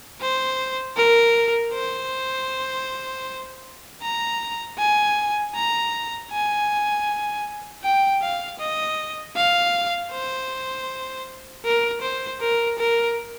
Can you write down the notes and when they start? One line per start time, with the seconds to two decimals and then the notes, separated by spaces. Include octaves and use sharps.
0.21 C5
0.97 A#4
1.73 C5
4.02 A#5
4.78 G#5
5.55 A#5
6.31 G#5
7.83 G5
8.22 F5
8.59 D#5
9.36 F5
10.11 C5
11.65 A#4
12.02 C5
12.41 A#4
12.79 A#4